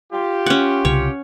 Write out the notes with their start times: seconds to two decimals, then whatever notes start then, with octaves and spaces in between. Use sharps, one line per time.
0.13 F4 G4
0.46 C#4 F#5
0.85 C2 C#3 C#5